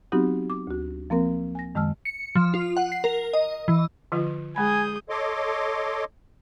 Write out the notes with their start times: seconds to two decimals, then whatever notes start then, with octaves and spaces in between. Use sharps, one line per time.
0.12 F#3 B3 C4 D#4 F#4 G4
0.50 D6
0.67 D2 F#4
1.10 F3 A#3 C4 A#4
1.55 G#5 A#6
1.75 F#2 D#3 G#3 A5 E6 F6
2.05 C#7
2.35 F3
2.54 F4
2.77 F#5
2.92 C7
3.04 A#4
3.33 D#5
3.68 E3
4.12 D3 F3 F4
4.56 G#3 G#4 G#5 B5 D#6 G6
5.09 A4 C#5 D#5 C6 D6